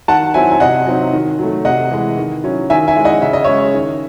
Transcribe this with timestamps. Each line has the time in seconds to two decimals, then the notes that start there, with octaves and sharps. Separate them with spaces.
0.08 D#3 F#5 A5
0.34 F#3 C4 E4 E5 G#5
0.51 G#5
0.60 C3 D#5 F#5
0.87 F#3 C4 D#4
1.13 D#3
1.39 F#3 A3
1.65 C3 D#5 F#5
1.91 E3 G#3
2.17 D#3
2.44 F#3 C#4 E4
2.70 D#3 E5 G#5
2.88 E5 G#5
2.95 G#3 C#4 E4
3.05 D#5 F#5
3.22 C#3 E5
3.33 D#5
3.44 G#3 C#4 C#5 E5
3.74 D#3